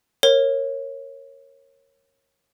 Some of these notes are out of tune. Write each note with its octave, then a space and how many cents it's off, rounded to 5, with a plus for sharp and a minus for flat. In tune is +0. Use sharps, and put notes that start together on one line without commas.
A#4 +0 C#5 -25